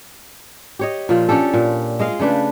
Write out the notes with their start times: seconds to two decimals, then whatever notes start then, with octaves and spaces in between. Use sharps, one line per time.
0.79 G4 C#5 D#5
1.09 A#2 F3
1.29 C#4 D4 G4 A4
1.54 A#2
1.99 G#3 D#5 F5
2.20 C#3 A3 D4 B4